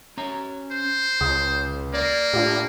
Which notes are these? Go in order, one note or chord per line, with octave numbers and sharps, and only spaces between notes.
C#4 A#5
C5
C#2 C#3 D#6
A#3 D5
A2 D4 F4 G4